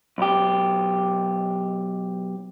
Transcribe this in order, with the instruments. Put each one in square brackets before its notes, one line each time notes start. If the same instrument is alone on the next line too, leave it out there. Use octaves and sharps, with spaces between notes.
[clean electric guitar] B1 G4